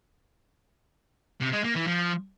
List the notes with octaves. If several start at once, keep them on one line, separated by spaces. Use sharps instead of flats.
C3
G#3
A#3
E3
F3